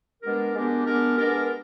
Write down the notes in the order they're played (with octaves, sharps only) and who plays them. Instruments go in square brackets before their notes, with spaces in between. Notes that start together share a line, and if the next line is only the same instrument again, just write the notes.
[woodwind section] G#3 B3 D4 G4 A#4
G#3 B3 D4 G4 A#4
G#3 B3 D4 G4 A#4
G#3 B3 D4 G4 A#4